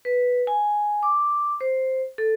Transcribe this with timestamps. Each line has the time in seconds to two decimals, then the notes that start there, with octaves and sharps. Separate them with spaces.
0.05 B4
0.47 G#5
1.03 D6
1.61 C5
2.18 A4